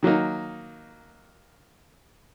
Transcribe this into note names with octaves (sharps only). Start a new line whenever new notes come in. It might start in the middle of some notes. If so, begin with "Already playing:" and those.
D#3 F#3 A#3 D#4